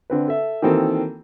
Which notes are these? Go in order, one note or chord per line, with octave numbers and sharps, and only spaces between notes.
D3 C4 B4
A4 E5
D#3 E3 A#3 C4 F#4 A4